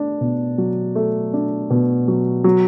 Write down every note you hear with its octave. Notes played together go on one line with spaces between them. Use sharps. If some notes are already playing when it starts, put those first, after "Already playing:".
Already playing: A3 D4
B2
F#3
A3
D4
B2
F#3
F#3